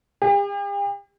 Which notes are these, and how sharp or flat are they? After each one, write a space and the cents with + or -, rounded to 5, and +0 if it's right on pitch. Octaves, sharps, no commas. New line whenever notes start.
G4 +45